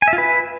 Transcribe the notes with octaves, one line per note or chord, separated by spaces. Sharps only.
G#5
E5
F4
B4